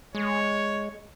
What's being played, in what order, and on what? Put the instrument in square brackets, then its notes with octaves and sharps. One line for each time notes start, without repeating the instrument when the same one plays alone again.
[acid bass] G#3 [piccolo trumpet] C#5